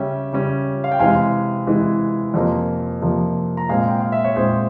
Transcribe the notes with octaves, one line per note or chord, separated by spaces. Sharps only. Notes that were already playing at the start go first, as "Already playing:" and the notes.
Already playing: C#3 G3 C#4 E5 G5
C#3 G3 C#4
F5
G5
C3 E3 G#3 F5 G#5
C3 E3 G#3
F2 C3 F3 A#3
F2 C3 F3 A#3
A#5
A#2 G#3 C4 F5 G#5
G5
F5
E5
C#5
A#2 G#3 C4 G#4 C5